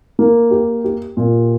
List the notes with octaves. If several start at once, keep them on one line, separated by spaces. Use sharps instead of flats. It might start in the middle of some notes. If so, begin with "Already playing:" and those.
A#3
G4
G4
A#2